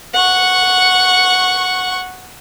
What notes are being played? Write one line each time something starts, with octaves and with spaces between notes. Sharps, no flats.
F#5 C#6